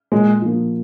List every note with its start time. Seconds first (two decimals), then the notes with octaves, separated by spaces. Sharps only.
0.12 A#2 G#3
0.42 F3 A#3